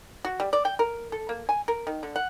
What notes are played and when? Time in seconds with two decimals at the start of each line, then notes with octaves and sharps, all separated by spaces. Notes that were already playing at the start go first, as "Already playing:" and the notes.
0.25 F#4
0.40 G3
0.53 D5
0.65 G5
0.79 A#4
1.12 A4
1.29 A#3
1.49 G#5
1.68 A#4
1.87 D#3
2.03 D3
2.16 F#5